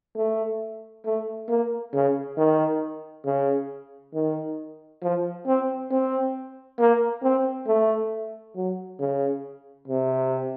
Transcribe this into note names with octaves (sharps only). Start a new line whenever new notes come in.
A3
A3
A#3
C#3
D#3
C#3
D#3
F3
C4
C4
A#3
C4
A3
F#3
C#3
C3